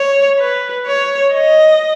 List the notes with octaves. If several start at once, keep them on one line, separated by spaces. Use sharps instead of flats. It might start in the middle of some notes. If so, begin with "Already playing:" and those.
Already playing: C#5
B4
C#5
D#5